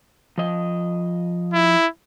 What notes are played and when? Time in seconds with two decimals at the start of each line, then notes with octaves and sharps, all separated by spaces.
0.38 F3 D#5
1.53 E4